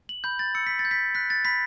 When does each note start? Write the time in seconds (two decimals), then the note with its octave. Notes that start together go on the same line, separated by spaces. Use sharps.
0.09 F#7
0.24 B5 G6
0.39 A6
0.55 E6 C#7
0.67 B6
0.79 A6
0.85 G6
0.91 B6
1.15 F#6 B6
1.30 A6
1.45 B5 B6